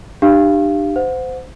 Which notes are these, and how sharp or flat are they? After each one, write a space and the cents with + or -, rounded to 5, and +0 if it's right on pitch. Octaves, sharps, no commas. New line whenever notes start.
D4 +40 G4 +0 F5 -15
C5 -25 F#5 -30